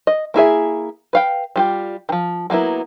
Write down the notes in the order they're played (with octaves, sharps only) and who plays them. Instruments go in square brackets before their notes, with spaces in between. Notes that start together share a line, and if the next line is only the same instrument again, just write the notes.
[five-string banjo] D#5
A#3 E4 G#4 E5
B4 F5 G5
G3 F4 G4
D#3 F3
F#3 A#3 B3 E4